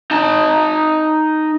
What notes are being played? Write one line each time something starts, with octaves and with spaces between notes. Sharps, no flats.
D#4 A5